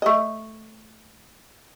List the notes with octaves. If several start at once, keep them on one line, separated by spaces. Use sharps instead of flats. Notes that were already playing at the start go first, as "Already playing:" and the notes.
A3 D#5